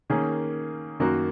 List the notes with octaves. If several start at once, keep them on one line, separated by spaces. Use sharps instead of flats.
D#3 A#3 C#4 G#4
F#2 D#3 A#3 F#4